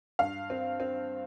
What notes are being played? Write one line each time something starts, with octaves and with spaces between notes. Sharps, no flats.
G2 F5
C4
C4